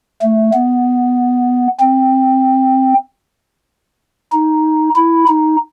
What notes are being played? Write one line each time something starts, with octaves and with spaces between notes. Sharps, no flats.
A3
B3
C4
D#4
E4
D#4